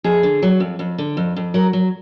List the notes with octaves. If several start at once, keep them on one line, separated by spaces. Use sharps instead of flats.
F2 G#4
D3
F#3
F2
F2
D3
F2
F2
F#3 A#4
F#3